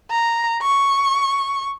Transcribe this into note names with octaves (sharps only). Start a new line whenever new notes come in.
A#5
C#6